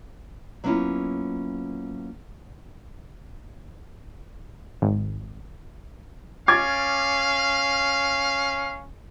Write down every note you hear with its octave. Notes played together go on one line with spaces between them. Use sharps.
F#3 A#3 B3 C#4 E4 F4
G#1
C#4 F5 D6 G#6 A6